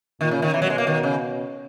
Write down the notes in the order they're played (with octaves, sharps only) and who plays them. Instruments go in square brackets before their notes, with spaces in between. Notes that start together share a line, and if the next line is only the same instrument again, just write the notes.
[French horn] A#2 [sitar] D#3
[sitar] C#3
D#3
[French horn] B2 [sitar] E3
[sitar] F#3
G#3
A#3
D#3
C#3